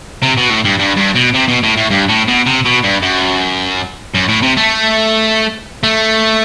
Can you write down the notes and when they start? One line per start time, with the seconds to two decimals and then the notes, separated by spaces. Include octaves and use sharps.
0.22 C3
0.37 B2
0.50 A2
0.65 G2
0.79 G2
0.97 G2
1.16 B2
1.34 C3
1.48 B2
1.63 A2
1.77 A2
1.90 G2
2.09 A2
2.28 B2
2.46 C3
2.65 B2
2.84 G2
3.02 F#2
4.14 F#2
4.28 A2
4.42 C3
4.57 A3
5.83 A3